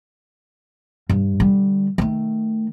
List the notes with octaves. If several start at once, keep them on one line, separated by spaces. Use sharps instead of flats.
G2
D3 G3
D#3 A3